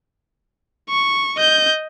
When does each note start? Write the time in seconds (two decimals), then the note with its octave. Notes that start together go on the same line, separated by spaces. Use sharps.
0.90 C#6
1.37 D#5 G6